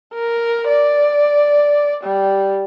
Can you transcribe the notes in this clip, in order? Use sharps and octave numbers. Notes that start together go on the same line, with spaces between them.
A#4
D5
G3